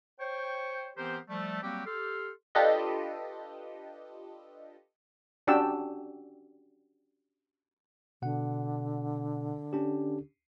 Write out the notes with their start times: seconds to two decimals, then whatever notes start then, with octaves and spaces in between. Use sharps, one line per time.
0.20 C5 C#5 G5 C#6
0.97 E3 B3 C4 G4 A#4 C5
1.29 F3 G3 A3
1.63 F#3 G3 A#3 C4 F#4 G4
1.86 G4 A4 C6 F6
2.55 D4 F4 G4 A4 B4 D#5
5.47 C#4 D4 F#4 G4 G5 E6
8.22 B2 D3 F#5
9.73 C#4 D4 G4